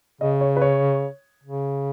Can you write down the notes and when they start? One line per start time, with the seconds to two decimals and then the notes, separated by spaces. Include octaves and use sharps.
0.21 C#3 D#5
0.41 C#5
0.57 B4
0.62 C#5
1.44 C#3